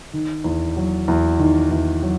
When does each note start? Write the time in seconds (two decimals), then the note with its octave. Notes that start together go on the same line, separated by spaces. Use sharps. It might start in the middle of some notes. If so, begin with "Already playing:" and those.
0.13 D#3
0.44 E2
0.77 F#3
1.08 E2
1.39 D#3
1.71 E2
2.03 F#3